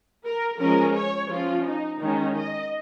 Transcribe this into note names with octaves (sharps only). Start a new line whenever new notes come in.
A#4
F3 G#3 C#4 A#4
C#5
F3 C#4 F4
D#4
D#3 G#3 C#4 D#4
D#5